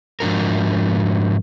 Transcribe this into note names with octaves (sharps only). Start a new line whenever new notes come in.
G#2 F3 D4 F#4 A#4